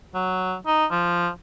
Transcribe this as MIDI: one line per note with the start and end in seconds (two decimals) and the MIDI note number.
0.14 0.56 54
0.67 0.85 63
0.91 1.30 53